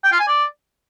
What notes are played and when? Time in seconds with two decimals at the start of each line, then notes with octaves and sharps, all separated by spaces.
0.04 G5
0.12 F4
0.20 G#5
0.28 D5